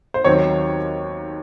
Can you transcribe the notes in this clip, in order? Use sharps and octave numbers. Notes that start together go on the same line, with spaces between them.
C5
D#2 D#3 F#3 C4 C#5